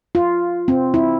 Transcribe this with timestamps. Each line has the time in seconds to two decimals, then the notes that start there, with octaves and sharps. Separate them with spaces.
0.15 F4
0.68 C4
0.94 E4